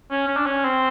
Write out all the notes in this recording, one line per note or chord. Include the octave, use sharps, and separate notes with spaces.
C#4
C#4
D4
C#4
C4